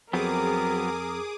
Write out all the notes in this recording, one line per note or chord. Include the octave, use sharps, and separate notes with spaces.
F2 F#3 B3 C4 G#4 A#4 D6 D#6